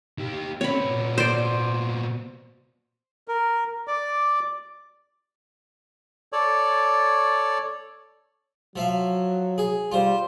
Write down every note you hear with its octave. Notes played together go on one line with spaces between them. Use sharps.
D#3 G4
C4 C#4 C#5 B5
A#2 B3
C5 D5
A#4
D5 D6
A4 C#5 D5
F3 F#3 E5 F5
G#4
G3 F4 C5